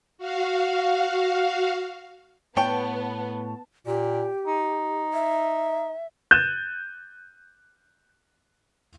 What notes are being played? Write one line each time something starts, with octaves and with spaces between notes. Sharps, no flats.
F#4 F5
A2 B3 C#5 G5 A5
A#2 G4
D#4
E5
F#6 G6 A6 D#7 E7